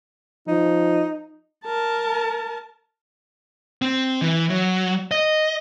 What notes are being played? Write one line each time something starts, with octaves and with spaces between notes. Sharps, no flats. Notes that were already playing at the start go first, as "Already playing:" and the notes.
F3 D#4
A#4 A5
C4
E3
F#3
D#5